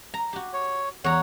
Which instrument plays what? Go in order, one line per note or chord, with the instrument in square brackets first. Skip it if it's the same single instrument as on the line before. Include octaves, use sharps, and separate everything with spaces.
[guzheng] A#5
F#4 G4
[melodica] C#5
[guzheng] E2 A#5 [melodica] C#5 F#5